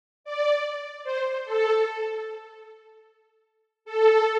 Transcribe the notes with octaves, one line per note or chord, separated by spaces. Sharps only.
D5
C5
A4
A4